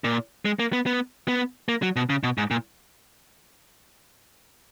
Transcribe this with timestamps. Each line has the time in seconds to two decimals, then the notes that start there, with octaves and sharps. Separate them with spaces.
0.04 A#2
0.45 G#3
0.59 A#3
0.73 B3
0.86 B3
1.28 B3
1.69 A#3
1.82 F#3
1.96 B2
2.10 C#3
2.23 B2
2.38 G#2
2.51 A#2